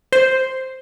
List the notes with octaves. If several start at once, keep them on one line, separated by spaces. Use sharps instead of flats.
C5